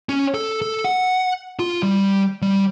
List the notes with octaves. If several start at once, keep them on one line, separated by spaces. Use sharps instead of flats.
C#4
A4
A4
F#5
F4
G3
G3